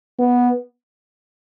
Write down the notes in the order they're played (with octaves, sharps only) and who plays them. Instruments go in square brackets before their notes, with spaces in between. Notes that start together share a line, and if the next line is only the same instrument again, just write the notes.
[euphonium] B3